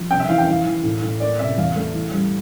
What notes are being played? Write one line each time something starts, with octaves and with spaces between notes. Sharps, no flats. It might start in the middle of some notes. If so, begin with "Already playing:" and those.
Already playing: F3
C3 G5
E5
E3 F5
G5
E3 F5
E3
A2
A2
A#3 D5
C3 E5
E2 F5
A3
E3
G3